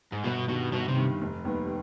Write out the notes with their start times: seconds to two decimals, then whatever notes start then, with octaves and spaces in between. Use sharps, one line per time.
0.12 G#2
0.24 G1 B2
0.48 G2 B2 D#3
0.72 G1 B2
0.88 C3
0.96 G2 D#3
1.21 F1
1.45 D#2 D#3 G3 B3